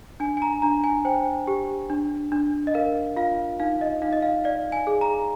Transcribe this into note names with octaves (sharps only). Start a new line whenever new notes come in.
D4 G#5
G#5
A#5
D4 A#5
G#5
C5 G5
G4
D4
D4
D#5
A#4 F5
F4 F5
D#4 F5
D#5
D#4 F5
D#5
F5
D5 F5
G#5
G#4
A#5